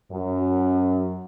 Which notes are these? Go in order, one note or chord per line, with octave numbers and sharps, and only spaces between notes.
F#2